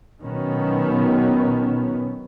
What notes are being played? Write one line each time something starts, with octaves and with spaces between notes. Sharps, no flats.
B2 D#3 F#3 B3 C#4